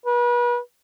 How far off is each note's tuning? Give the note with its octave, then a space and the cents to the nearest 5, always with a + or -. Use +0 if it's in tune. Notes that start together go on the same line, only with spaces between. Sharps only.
B4 -35